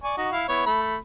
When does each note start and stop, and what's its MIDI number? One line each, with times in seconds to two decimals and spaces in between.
0.04 0.15 74
0.04 0.15 80
0.04 0.15 85
0.17 0.32 63
0.17 0.32 66
0.32 0.47 64
0.32 0.47 77
0.48 0.64 59
0.48 0.64 64
0.48 0.64 73
0.66 0.97 57
0.66 0.97 83